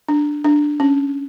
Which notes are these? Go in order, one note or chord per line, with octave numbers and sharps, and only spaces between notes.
D4
D4
C#4